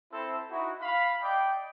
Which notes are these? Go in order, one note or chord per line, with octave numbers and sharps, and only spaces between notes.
C4 E4 A4 C5
D#4 E4 F#4
F5 B5
D5 D#5 G5